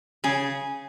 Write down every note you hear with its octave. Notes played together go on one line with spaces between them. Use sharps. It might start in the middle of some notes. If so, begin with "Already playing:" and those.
C#3 G#4